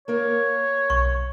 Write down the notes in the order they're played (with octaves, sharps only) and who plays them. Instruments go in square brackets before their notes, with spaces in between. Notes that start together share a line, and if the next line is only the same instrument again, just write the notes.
[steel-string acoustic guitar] A#3 A#4 F5 [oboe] C#5
[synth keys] B1 [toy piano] C#6